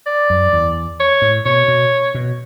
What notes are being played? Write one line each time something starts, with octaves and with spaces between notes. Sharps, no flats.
D5
F#2
E2
C#5
A2
B2 C#5
B2
B2